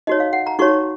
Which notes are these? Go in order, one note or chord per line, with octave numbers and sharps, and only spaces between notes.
D#4 F#4 C#5 D#5
F5
F#5
A#5
D#4 F#4 C#5 C#6